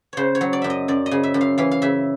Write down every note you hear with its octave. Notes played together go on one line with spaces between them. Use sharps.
C#3 C5 C#5
C#5
F#3
D5
F#2 E5
D#5
F#2 D5
D#5
C#3
E5
F#2
F5
E3 F5
F5
C#3 E5